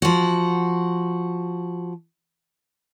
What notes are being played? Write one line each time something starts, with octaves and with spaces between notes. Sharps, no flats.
F3 F#4